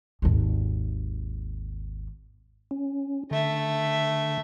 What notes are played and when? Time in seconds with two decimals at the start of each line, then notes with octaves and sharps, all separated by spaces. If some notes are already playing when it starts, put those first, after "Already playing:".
0.22 G#1 D#2
2.71 C#4
3.31 D3 A3 E5